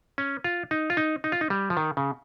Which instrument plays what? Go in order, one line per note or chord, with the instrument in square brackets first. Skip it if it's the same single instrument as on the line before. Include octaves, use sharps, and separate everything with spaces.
[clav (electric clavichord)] C#4
F4
D#4
F4
D#4
D#4
F4
D#4
G3
F3
D#3
C#3